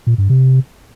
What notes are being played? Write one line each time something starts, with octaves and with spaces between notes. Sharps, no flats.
A#2
G2
C3